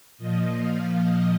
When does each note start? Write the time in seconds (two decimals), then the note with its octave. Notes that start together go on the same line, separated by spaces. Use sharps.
0.18 A#2 F3 D#5
0.59 F5
0.99 D#5